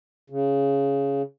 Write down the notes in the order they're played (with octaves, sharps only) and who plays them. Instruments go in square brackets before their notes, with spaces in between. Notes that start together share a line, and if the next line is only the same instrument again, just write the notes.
[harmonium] C#3